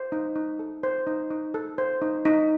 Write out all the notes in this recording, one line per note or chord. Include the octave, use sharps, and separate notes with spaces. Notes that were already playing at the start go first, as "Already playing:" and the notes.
Already playing: C5
D#4
D#4
A4
C5
D#4
D#4
A4
C5
D#4
D#4